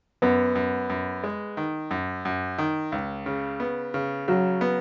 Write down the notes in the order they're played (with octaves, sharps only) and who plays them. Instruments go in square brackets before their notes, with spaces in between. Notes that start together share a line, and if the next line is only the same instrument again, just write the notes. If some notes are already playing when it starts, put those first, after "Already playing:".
[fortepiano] F#2 [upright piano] B3
[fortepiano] F#2
F#2
G#3
D#3
F#2
F#2
D#3
C#2
C#3
B3
C#3
[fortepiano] C#3 [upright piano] F#3
[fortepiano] B3